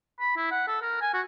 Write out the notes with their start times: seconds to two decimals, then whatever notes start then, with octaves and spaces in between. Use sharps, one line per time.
0.20 B5
0.36 E4
0.51 F#5
0.67 A4
0.82 A#4
1.01 G#5
1.14 F#4